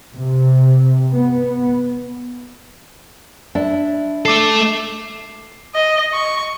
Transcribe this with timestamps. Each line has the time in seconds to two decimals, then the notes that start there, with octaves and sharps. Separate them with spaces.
0.16 C3
1.12 B3
3.55 D4 E4
4.26 A3 A4 D6 C7
5.75 D#5
6.14 C#6